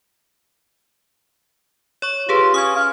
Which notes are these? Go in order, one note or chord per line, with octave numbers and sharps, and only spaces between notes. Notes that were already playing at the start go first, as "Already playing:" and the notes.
C#5 C#6
F4 G4 G#4 B4
C#4 D#6 G#6
F5